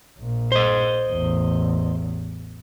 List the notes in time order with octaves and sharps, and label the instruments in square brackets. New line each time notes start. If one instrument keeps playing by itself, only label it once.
[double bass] A#1 A#2
[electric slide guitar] C5 D#5
[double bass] A1 E2